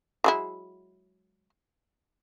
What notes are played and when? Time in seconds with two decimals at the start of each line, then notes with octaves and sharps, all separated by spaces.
0.24 F#3 G#3 E4